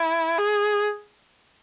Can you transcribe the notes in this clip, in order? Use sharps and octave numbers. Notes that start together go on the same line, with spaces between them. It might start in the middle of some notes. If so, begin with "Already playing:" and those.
Already playing: E4
G#4